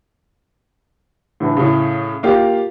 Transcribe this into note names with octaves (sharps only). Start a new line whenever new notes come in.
A2 D3 E3
A2 C#3
A#3 F4 G4